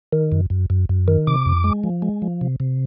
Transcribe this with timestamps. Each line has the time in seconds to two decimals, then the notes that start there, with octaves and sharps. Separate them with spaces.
0.13 D#3
0.32 F#2
0.50 F#2
0.70 F#2
0.89 F#2
1.08 D#3
1.27 C3 D6
1.46 F2
1.64 G#3
1.84 F3
2.02 G#3
2.22 F3
2.41 C3
2.60 C3